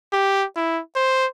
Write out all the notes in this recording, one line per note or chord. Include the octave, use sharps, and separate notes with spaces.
G4
E4
C5